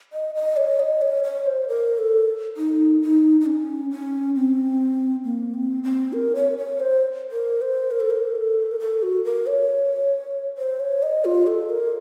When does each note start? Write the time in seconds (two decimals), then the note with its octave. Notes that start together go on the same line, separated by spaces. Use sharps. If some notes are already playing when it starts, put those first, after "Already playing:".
0.13 D#5
0.35 D#5
0.57 C#5
0.80 D#5
1.02 C#5
1.24 C#5
1.46 C5
1.68 A#4
1.98 A4
2.57 D#4
3.02 D#4
3.41 D#4
3.46 C#4
3.91 C#4
4.36 C4
5.24 A#3
5.54 C4
5.83 C4
6.13 A#4
6.35 C#5
6.58 C#5
6.80 C5
7.31 A#4
7.62 C5
7.91 A#4
8.00 A4
8.10 A#4
8.35 A4
8.71 A#4
8.80 A4
9.03 F#4
9.24 A#4
9.47 C#5
10.58 C5
10.80 C#5
11.03 D#5
11.25 F4
11.47 A4
11.69 A#4